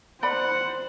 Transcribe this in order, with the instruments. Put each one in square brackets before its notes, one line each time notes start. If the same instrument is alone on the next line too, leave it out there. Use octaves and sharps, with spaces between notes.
[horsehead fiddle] C5 [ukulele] D5 B5 [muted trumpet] F#5